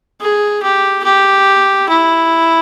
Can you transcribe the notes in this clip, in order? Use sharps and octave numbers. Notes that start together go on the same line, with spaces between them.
G#4
G4
G4
E4